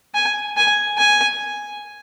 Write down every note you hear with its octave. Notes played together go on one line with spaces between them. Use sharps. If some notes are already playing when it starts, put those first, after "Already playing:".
G#5
G#5
G#5